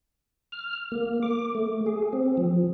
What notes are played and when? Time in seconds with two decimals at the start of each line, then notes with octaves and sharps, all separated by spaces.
0.52 F6
0.92 A#3
1.23 D6
1.55 A3
1.86 G#4
2.13 C4
2.37 F3